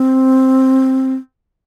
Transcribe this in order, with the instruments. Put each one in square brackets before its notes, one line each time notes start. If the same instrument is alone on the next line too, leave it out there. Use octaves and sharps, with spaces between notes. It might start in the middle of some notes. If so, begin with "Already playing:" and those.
Already playing: [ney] C4